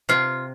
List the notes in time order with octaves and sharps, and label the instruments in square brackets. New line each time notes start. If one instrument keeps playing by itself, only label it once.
[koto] C3 F4